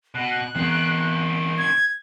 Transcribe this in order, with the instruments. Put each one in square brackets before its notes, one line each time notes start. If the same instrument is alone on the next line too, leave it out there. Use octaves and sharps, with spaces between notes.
[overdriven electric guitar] B2 [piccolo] F#6
[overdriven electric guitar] D#3 C4 [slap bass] E3 B3
[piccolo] G#6